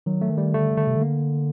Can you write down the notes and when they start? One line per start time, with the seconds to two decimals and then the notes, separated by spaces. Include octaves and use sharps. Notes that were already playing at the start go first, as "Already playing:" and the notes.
0.06 D#3 F#3
0.21 A3
0.30 D#3
0.38 G3
0.54 D3 A3
0.77 D3 A3
0.87 C3
0.96 D3
1.01 A#3